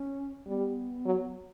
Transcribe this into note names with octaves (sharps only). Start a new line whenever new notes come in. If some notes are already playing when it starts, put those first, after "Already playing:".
Already playing: C#4
G3 B3
F#3